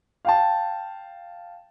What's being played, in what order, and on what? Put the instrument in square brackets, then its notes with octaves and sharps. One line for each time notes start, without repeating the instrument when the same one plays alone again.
[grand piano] F5 G5 A5